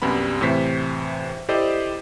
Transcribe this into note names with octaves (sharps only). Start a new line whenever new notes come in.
C2 F#2 G3 B3 B5
A2 C3 E3 C5 B6
E4 G4 A4 C5 D5 D#5